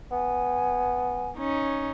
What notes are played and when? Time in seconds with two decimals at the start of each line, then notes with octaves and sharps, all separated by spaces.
0.12 B3 G#5
1.38 C#4 D#4